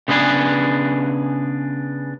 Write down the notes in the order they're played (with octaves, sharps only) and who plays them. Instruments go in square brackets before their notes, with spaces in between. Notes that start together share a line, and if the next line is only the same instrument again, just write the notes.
[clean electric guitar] C#3 B3 D4 G#4 B4